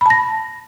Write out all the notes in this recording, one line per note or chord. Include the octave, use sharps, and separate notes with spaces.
A5 B5 A#6